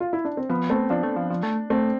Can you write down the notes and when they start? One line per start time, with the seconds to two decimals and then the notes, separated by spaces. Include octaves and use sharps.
0.00 F4
0.13 E4
0.25 D4
0.37 C4
0.49 F3 B3
0.70 A3 C4
0.90 F3 D4
1.03 A3
1.16 F3
1.30 F3
1.43 A3
1.70 A3 C4